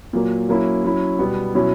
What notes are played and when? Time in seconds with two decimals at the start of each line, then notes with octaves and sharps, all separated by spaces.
0.13 A#2 F#3 A#3
0.49 F#3 A#3 C#4 E4
0.84 F#3 C#4 E4
1.19 B2 G3 B3
1.55 B2 F#3 C#4 E4